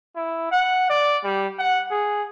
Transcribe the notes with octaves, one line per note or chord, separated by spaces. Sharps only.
E4
F#5
D5
G3
F#5
G#4